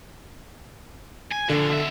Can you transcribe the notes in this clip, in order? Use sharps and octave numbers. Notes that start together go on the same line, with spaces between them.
G#5
A#2 D3 F3
B2 E5